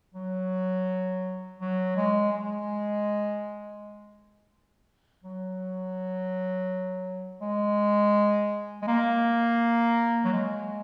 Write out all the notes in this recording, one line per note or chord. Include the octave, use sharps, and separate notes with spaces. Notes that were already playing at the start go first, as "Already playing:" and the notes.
F#3
F#3
G#3
G#3
F#3
G#3
G#3
A#3
F#3
G#3